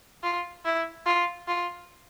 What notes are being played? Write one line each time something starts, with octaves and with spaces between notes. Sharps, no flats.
F4
E4
F4
F4